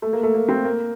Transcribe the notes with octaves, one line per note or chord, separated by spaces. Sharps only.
A3
A#3
A3
A#3
C4
A#3